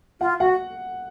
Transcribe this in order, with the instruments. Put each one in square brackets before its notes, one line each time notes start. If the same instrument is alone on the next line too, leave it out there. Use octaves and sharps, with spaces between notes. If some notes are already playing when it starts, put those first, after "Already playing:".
[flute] F4 [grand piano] F#5
[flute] F#4 [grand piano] F#5